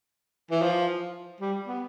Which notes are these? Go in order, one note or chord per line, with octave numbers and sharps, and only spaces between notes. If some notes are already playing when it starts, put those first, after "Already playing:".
E3
F3
G3
B3